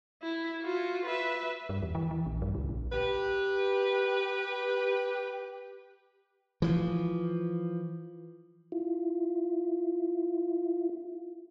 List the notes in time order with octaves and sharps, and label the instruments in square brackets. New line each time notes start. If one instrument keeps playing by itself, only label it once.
[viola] E4
F4 F#4
B4 E5
[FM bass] G2
E2
E3
E3
A#1
G2
C#2
A#1
[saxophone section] G4 B4
[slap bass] E3 F3
[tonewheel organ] E4 F4